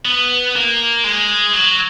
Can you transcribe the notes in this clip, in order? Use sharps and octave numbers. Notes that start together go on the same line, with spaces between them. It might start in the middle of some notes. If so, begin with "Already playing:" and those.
B3
A#3
G#3
F#3